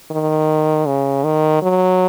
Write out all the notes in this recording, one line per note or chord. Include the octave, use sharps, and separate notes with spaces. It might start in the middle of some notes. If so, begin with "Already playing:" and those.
D#3
C#3
D#3
F#3